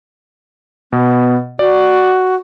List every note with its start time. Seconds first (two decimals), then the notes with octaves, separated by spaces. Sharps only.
0.92 B2 B3
1.59 F#4 D5